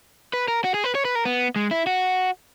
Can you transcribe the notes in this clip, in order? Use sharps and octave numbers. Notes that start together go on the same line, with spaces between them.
B4
A#4
F#4
G#4
B4
C#5
B4
A#4
B3
G#3
E4
F#4